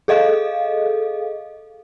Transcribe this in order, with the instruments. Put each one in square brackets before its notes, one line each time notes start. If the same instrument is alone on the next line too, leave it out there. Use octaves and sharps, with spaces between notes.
[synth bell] G#4 A4 D#5 F5